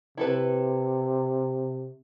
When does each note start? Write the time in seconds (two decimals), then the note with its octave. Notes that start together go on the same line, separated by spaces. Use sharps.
0.17 C3 E4 A4 B4